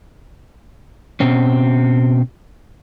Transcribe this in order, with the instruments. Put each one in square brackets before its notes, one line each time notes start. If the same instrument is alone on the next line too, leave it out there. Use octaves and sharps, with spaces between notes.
[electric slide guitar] B2 C4 C#4